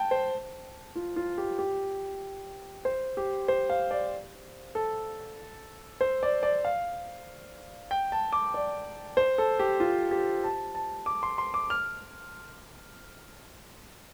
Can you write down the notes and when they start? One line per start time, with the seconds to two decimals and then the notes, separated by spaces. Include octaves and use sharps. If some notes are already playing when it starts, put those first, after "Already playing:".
Already playing: G5 A5
0.11 C5
0.96 F4
1.16 F4
1.38 G4
1.59 G4
2.85 C5
3.17 G4
3.48 C5
3.70 F5
3.91 D5
4.75 A4
6.01 C5
6.23 D5
6.43 D5
6.65 F5
7.91 G5
8.12 A5
8.33 D6
8.54 D5
9.17 C5
9.38 A4
9.59 G4
9.80 F4
10.11 G4
10.44 A5
10.75 A5
11.06 D6
11.23 C6
11.38 C6
11.54 D6
11.70 F6